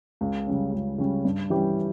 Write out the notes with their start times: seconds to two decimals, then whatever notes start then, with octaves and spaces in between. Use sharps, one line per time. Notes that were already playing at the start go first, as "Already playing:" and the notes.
0.21 C#2
0.47 C#3 G3 C#4
0.73 C#2
0.98 C#3 G3 C#4
1.25 G2
1.50 E3 G3 C#4 G4